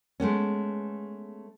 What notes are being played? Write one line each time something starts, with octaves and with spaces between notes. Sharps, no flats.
G#3 A3 B3 C#4